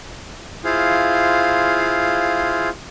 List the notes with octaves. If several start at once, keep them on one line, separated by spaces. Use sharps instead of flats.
E4 F4 G#4 C5 F5